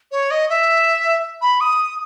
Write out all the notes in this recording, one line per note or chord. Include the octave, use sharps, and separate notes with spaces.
C#5
D#5
E5
B5
D#6